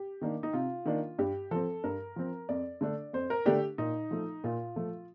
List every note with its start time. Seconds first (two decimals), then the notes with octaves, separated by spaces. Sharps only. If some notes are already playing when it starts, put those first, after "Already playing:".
Already playing: G4
0.21 D#3 A#3 D4
0.43 D#4
0.53 C3 F4
0.86 D#3 A#3 D4
1.19 G2 G4
1.51 F3 C4 A4
1.84 G2 A#4
2.16 F3 C4
2.49 F2 D5
2.81 D3 A3 D4
3.13 F2 C5
3.30 A#4
3.46 D3 A3 D4 G4
3.78 A#2 D#4
4.11 F3 A3
4.44 A#2 F4
4.76 F3 A3